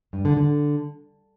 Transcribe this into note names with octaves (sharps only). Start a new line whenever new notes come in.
G2
D3
D3